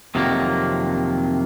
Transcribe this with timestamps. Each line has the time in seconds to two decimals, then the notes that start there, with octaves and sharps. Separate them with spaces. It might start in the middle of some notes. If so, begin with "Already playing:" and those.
0.15 F2 C3 D#3 F#3 A#3